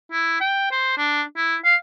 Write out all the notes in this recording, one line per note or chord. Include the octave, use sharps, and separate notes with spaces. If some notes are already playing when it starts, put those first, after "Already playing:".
E4
G5
C5
D4
E4
F5